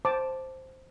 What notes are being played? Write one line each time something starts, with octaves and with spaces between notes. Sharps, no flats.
C5 A5 D6